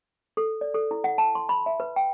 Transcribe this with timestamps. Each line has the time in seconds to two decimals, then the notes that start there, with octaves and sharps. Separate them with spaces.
0.37 A4
0.61 D5
0.75 A4
0.91 E4
1.04 F#5
1.18 A5
1.35 C6
1.49 B5
1.66 E5
1.80 B4
1.96 G5